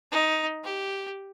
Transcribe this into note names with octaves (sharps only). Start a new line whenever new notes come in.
D#4
G4